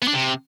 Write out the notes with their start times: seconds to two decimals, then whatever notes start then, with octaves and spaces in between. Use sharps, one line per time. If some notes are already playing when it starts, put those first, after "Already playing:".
0.02 B3
0.08 D4
0.13 C3